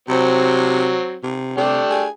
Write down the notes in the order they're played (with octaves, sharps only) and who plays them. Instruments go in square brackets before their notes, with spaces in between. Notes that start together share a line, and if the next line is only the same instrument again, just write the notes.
[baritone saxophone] C3 [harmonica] F#3 C4
[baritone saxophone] C3
[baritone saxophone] C3 [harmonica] A3 D4 G4
[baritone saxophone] G#4